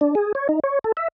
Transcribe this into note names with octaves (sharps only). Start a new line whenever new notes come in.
D4
G#4
C#5
D#4
C#5
A4
E5